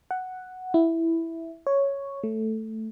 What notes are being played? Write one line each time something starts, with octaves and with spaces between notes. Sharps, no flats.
F#5
E4
C#5
A3